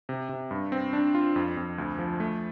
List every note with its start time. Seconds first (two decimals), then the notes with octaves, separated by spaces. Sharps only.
0.09 C3
0.29 C3
0.51 G2
0.72 C4
0.93 D4
1.15 F4
1.36 F2
1.57 F2
1.78 D2
1.99 F3
2.20 A3